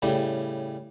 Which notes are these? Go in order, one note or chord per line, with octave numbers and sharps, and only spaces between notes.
A2 C#3 G3